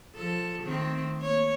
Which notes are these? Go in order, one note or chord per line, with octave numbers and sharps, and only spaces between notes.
F3 A4
D#3 A3 C4
A#3 C#5